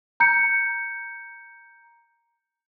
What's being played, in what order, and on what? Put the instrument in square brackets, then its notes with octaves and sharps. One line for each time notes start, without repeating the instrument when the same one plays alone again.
[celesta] A#5 G6 C#7